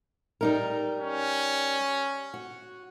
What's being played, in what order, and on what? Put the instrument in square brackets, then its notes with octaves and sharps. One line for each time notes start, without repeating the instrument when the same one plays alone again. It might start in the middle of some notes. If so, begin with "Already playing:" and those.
[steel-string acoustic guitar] G3 D#4 A#4
[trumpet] C#4
[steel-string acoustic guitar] F#4